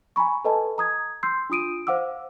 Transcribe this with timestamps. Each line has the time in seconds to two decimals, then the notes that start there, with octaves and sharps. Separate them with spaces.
0.16 G#5 A#5 B5 C#6
0.45 A4 B4 D#5 G#5 A5
0.78 A#5 D#6 G#6
1.23 C6 E6 G6 C7
1.50 D4 F4 D#6 D7 D#7
1.87 C5 F5 F#5 D6 E6